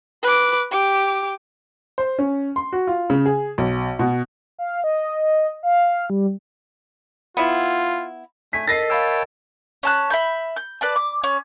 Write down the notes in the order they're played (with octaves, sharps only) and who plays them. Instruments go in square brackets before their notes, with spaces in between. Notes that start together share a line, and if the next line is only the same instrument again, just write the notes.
[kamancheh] B4 D6
G4 D6
[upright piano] C5
C#4
C6
F#4
F4
C#3
G#4
B1
B2
[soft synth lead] F5
D#5
F5
G3
[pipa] B3 E4 [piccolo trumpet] F4
[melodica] A3 G#5 [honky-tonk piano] B6
[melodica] A4 [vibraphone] A#4 D#5 [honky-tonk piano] A6 A#6 C7
[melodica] C#5 G5 A5 [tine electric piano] F5 B5 E6
[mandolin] C#4 A5 F#6
E5 B5 G6
G6
B4 D5 A5
D6
C#4